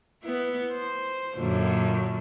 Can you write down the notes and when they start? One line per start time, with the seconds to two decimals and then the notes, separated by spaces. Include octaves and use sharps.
0.23 B3 E4
0.73 C5
1.35 F#2 A#2 D3